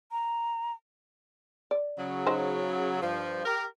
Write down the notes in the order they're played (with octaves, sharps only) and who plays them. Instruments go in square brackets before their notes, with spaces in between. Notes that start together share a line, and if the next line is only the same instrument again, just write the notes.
[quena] A#5
[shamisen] D5
[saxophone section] C#3 F#3
[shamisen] D#4 F#4 C5
[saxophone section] G2 F3
G4 A#4